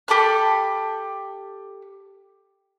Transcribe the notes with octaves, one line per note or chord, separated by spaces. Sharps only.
G4 A4 B5 F6